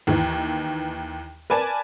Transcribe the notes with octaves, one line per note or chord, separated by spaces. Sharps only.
D#2 D#3 E3
A#4 B4 D5 G#5 A5